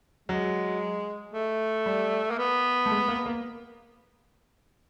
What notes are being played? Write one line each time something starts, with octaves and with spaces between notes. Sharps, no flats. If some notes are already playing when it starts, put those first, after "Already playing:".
F#3 G#3
A3
G3
A#3
B3
A3
G#3
A#3
A#3